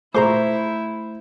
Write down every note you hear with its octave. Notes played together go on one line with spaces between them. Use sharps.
A#2 A3 E4 G#4 C5 A#5 C#6